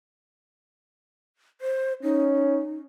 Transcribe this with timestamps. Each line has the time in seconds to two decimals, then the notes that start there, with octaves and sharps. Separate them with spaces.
1.61 C5
2.03 C#4 D#4